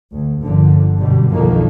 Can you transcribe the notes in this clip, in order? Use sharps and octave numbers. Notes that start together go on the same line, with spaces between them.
D2
G1 A#2 D3 F3
F#2 B2 D3 G3
B1 F2 D3 D#3 F#3 A#3